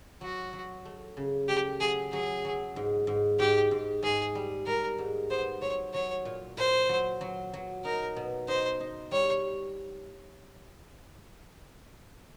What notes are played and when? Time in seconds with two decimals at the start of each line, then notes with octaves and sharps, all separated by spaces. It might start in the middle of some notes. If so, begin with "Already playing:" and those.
0.21 F#3 F#4
0.53 F#3
0.85 A3
1.17 C#3
1.48 A3 G4
1.80 F#3 G#4
2.12 F#3 G#4
2.45 F#3
2.76 G#2
3.07 G#2
3.39 G#2 G4
3.71 G#2
4.03 G#2 G#4
4.35 G3
4.66 G3 A#4
4.98 G#2
5.30 B3 C5
5.62 F#3 C#5
5.93 F#3 C#5
6.25 A#2
6.57 A#2 C5
6.89 F#3
7.21 F#3
7.54 F#3
7.85 D#4 A#4
8.16 B2
8.48 D#4 C5
8.80 D#4
9.11 G3 C#5